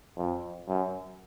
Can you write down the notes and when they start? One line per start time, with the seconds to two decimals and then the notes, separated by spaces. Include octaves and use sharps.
0.17 F2
0.68 F#2